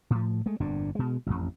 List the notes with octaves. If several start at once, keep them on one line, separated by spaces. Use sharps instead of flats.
A2 F3
G#3 A3
G1 F2 A#2 D4
B2 G#3
A1 F2